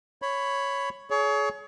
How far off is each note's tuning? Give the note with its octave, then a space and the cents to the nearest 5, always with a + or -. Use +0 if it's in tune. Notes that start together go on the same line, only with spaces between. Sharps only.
C#5 +0 B5 +10
G#4 +35 C#5 +30